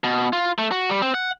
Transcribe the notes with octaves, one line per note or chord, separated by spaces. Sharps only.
B2
F4
A3
F#4
G3
C4
F#5